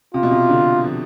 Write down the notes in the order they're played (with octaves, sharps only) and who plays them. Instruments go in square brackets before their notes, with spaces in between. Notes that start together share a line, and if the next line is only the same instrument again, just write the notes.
[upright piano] C3 [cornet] F4
[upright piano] B2
C3
D3
F3